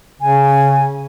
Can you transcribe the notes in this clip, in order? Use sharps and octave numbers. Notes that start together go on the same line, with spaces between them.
C#3 G#5